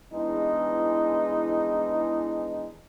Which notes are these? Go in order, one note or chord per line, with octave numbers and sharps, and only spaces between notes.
E2 E3 G#3 D4 D#4